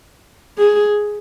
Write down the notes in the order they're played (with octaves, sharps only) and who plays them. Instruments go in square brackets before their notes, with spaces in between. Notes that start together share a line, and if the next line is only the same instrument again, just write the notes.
[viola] G#4